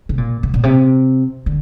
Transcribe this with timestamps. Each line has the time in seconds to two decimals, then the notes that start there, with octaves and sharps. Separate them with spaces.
0.09 C3
0.18 A#2
0.43 C3
0.54 A#2
0.63 C3
1.46 D3